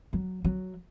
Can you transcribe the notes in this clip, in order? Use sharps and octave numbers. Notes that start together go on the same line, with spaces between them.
F#3
F#3